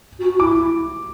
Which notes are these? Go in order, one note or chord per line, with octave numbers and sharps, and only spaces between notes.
F#4
F#4
E4 D6